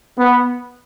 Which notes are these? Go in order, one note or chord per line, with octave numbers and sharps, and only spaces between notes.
B3